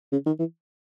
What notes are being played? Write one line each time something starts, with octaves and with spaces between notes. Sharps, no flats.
C#3
D#3
E3